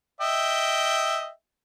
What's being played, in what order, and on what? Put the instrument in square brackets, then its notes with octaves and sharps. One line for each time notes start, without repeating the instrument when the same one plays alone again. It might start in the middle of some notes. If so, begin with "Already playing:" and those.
[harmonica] D#5 E5 G5